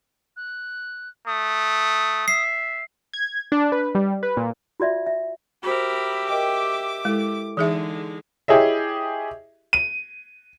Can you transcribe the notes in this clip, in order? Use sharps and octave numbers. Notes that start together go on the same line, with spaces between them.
F#6
A3 D#6
E5 C7
G#6
D4
B4
G3
B4
A#2
F4 F#4 D5 E5
E5
F#4 G4 A#4 C5 E5 B5
A#4 D#5 G5 D6
G#3 E4 A4
D3 E3 G#3 D#4 G#4 E5
E4 G4 G#4 C#5 D#5 E5
D#7